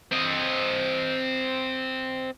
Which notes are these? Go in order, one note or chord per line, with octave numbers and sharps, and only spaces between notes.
C4 D#5